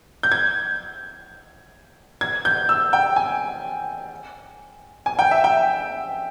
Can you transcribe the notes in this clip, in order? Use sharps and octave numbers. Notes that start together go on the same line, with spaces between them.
G6
G#6
G#6
G6
E6
G5
G#5
G#5
G5
E5
G5